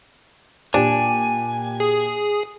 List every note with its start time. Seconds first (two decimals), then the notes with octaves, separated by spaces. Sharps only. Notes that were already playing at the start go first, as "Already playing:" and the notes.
0.74 A#2 D4 G4 G#5
1.80 G#4